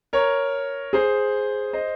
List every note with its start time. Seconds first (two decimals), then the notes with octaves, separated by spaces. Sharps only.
0.13 A#4 C#5
0.93 G#4 C5
1.73 C5 D#5